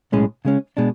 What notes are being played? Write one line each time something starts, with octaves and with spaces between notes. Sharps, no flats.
B1 A2 G#3 C#4 G#4
C#3 G#3 C#4
B2 G#3 D4